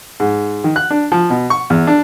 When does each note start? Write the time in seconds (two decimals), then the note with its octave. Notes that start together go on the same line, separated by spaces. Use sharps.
0.20 G#2
0.64 D#3
0.76 F#6
0.91 D4
1.12 F3
1.30 B2
1.50 C#6
1.70 E2
1.87 D4